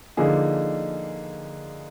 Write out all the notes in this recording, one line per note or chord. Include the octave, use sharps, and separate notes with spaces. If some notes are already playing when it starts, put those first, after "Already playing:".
D3 F3 A#3 D#4 G#4